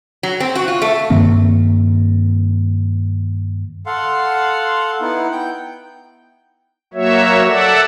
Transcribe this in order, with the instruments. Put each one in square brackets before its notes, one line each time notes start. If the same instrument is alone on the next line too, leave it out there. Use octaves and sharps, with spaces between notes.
[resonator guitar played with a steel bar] F#3
C4
F#4
F4
A3
[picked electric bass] G2 D#3 A#3 C4
[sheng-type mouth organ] A4 F5 F#5 C6
B3 D#4 E4 F#5
G5 G6
[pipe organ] F#3 A#3 F#4 C#5 E5
A4 D5 E5 F#5